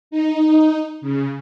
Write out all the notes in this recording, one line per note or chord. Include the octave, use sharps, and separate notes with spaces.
D#4
C#3